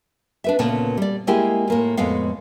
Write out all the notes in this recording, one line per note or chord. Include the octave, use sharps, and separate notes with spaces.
D4 B4 E5
D2 A#2 C#3 B3 A5
G3 D5
G#3 A#3 E4 G4 G#4 G#5
A2 A#3 F4
F2 A2 G#3 B3 F5